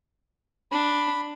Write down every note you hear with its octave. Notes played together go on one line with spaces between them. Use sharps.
D4 B5